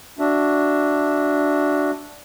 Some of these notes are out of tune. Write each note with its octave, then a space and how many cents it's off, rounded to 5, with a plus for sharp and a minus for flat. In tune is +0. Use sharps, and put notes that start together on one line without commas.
D4 +0 F#4 +5 E5 +0